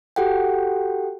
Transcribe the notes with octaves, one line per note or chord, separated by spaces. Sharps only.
F#4 G4 A4 F#5 G5